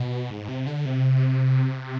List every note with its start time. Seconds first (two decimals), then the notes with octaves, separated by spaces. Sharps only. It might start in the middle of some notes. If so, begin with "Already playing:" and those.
Already playing: B2
0.30 G#2
0.49 C3
0.66 D3
0.85 C3